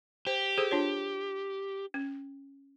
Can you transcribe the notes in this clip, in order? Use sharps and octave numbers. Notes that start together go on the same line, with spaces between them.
G4 C5
G#4 A4 C5
D4 F4 C#5
C#4